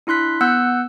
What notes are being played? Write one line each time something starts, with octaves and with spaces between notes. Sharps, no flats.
D4 E4 C6 F#6 B6
B3 F#5 E6 F#6 G6 C#7